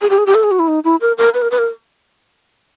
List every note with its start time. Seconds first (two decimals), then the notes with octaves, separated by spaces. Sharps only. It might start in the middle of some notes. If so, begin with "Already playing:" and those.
0.02 G#4
0.10 G4
0.18 G#4
0.26 G4
0.35 A4
0.43 G#4
0.51 F#4
0.59 E4
0.68 D#4
0.84 E4
1.01 A#4
1.18 A#4
1.34 B4
1.42 A#4
1.51 B4
1.59 A#4